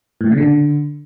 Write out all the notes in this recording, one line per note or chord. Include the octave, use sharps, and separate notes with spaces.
A2
A#2
C#3
D3